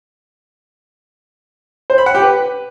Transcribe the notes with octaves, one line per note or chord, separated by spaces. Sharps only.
C5
B5
F#5
G4
B4